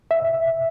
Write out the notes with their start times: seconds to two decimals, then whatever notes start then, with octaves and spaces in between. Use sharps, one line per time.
0.11 E5